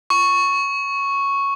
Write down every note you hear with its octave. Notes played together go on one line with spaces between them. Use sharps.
C#6